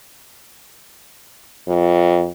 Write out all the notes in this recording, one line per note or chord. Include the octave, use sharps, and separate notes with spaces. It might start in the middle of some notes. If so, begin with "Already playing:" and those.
F2